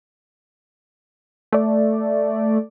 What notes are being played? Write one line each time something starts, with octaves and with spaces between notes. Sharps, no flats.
A3 D5